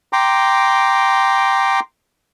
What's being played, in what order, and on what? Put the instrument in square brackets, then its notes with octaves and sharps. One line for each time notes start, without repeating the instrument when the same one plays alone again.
[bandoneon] G5 A#5 C6 D6